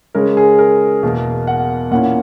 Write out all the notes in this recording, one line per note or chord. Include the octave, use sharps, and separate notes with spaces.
C#3 G#3 C#4 A#4
G#4
A#4
E2 B2 A#3
F#5
A#2 A#3 C#4 E4 F#5